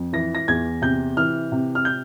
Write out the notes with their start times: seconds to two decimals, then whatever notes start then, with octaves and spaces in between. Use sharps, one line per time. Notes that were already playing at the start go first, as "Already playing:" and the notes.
Already playing: F2
0.13 E3 A#6
0.35 A#6
0.48 E2 G#6
0.82 C3 G6
1.17 E3 F6
1.52 C3
1.75 F6
1.85 G6